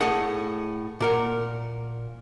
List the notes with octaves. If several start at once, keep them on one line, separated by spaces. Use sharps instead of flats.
A2 A3 G#4 F#5
A#2 A#4 F#5